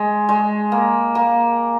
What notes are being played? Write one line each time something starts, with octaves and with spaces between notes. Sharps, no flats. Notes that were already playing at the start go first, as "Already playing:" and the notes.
Already playing: G#3
G#3
A#3
A#3